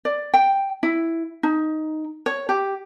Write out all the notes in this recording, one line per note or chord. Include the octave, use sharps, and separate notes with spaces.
D5
G5
E4
D#4
C#5
G4